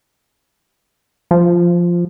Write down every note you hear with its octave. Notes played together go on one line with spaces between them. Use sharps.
F3